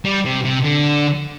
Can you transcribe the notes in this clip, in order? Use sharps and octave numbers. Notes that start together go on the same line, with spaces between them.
G3
C3
C3
D3